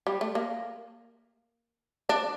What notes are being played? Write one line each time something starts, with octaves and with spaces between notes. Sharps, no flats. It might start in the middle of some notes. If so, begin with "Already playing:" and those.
G3
A3
A#3
D4